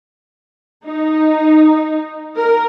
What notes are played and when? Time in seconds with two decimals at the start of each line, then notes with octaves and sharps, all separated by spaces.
0.85 D#4
2.36 A#4